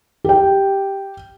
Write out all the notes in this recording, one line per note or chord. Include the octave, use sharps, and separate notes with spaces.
G4 G5